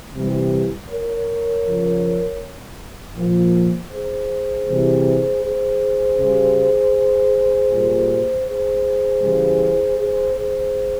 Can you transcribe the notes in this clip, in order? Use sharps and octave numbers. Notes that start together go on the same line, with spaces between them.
C3 E3 G3
A#4 C#5
C#3 F3
A#2 F3
G#4 C5
C3 E3 G3
G#4 C5
C#3 G3
A#2 G3
G#4 C5
C#3 E3 G3
G#4 C5
G#4 C5